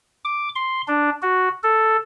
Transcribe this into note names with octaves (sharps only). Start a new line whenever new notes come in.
D6
C6
D4
F#4
A4